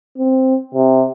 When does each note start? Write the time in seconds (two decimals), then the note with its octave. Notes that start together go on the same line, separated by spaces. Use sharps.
0.18 C4
0.74 C3